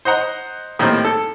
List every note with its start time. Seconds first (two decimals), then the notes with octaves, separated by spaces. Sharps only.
0.05 C5 D#5 F#5 A#5
0.79 A2 D#3 G3 A#3 C4
1.04 A4